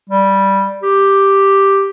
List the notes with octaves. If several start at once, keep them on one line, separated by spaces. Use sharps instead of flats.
G3
G4